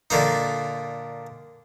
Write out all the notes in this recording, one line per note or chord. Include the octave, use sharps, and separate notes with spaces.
A#2 D3 A#3 D#4